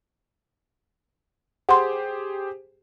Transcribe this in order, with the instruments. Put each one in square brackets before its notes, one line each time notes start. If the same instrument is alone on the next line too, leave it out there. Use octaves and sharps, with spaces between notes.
[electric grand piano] G4 G#4 C5 [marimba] F#5 C6